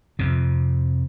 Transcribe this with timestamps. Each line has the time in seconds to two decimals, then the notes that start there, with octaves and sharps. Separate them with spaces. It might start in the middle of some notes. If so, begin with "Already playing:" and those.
0.19 F2 C3